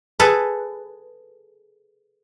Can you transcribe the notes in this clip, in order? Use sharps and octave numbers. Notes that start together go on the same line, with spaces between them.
G#4 A4 B4